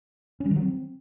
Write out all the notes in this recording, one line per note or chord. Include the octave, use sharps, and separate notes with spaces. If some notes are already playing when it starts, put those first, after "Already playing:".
C#4
G3
D#3
F#3
C4